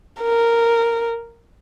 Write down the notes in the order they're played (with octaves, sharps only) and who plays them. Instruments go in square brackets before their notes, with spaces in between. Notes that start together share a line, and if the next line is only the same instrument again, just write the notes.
[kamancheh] A#4